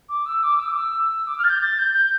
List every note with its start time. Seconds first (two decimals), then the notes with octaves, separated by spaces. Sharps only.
0.09 D6
0.26 E6
0.43 D6
0.59 E6
0.68 D6
0.78 E6
1.27 D6
1.38 F6
1.44 A6
1.49 G6
1.61 A6
1.78 G6
1.94 G6